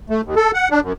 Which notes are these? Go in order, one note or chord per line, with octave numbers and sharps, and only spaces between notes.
A3
D#2
A4
F#5
D4
F#2